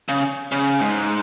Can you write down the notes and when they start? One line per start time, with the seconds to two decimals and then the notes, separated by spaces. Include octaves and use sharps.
0.09 C#3
0.52 C#3
0.81 G#2